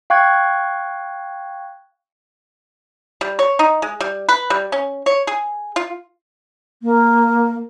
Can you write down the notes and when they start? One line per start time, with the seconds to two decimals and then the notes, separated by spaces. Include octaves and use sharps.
0.10 F5 G5 C#6 F#6 G#6
3.21 G3
3.39 C#5
3.59 D#4
3.82 G#3
4.00 G3
4.29 B4
4.50 G3
4.72 C#4
5.06 C#5
5.27 G#4
5.76 F4
6.83 A#3